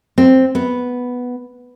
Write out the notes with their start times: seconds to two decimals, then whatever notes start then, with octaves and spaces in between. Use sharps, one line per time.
0.18 C4
0.55 B3